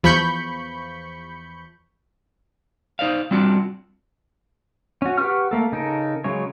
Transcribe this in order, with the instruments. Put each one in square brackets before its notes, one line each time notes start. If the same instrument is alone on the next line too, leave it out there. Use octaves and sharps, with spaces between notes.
[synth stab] E2 F3 B5 C#6 G6 C#7
[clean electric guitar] D#4 C5 D5 F5
G3 C4 D4 F4 F#4
[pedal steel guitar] C#4 F#4
G4 B4 F#5 C#6 F6
A3 A#3 A4
C#3 D#4 A4 A#4
C#3 F#3 G#3 C#5